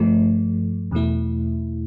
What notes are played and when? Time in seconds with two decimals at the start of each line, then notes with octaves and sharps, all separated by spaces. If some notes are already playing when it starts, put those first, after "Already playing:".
Already playing: G2 F3 A3
0.91 E2 B2 A3 E4